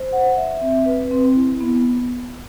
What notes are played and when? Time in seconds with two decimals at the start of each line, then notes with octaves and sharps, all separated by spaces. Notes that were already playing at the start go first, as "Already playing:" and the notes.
Already playing: C5
0.12 F#5
0.37 E5
0.61 C4
0.86 B4
1.11 C4
1.36 E4
1.60 B3